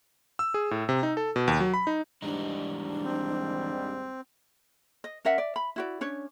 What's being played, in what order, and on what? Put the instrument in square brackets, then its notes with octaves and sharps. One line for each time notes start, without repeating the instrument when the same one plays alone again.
[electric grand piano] E6
G#4
A2
C3
D#4
A4
B2
D#2
F#3
B5
D#4
[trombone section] D#2 G#2 G3 [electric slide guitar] E3 G#3 D#4 [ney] D4
[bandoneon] C4
[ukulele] D#5
C#4 A#4 E5 F#5
D5
B5
E4 F#4 D5
C#4 D4 C#5